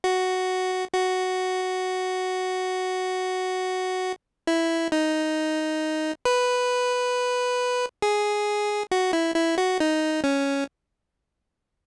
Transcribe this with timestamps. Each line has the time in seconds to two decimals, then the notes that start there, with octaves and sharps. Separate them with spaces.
0.04 F#4
0.93 F#4
4.47 E4
4.92 D#4
6.25 B4
8.02 G#4
8.91 F#4
9.13 E4
9.35 E4
9.58 F#4
9.80 D#4
10.24 C#4